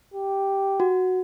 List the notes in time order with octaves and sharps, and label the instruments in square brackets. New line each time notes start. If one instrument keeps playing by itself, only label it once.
[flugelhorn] G4
[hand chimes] F#4